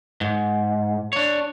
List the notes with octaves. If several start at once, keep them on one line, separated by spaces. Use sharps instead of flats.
G#2
D4 C#5